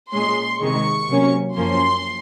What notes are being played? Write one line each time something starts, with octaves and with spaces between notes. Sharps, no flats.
A#2 G#3 C#4 C6
C3 D#3 G#3 C#6
C3 F#3 A#3 C#4
F#2 F3 A#3 C#4 C6